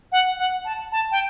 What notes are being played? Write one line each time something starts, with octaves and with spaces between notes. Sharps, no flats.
F#5
F#5
A5
A5
G5